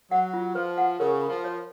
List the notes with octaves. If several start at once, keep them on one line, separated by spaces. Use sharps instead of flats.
F#3 F#5
F4
F3 B4
F#5
C#3 A#4
B5
F3
C#5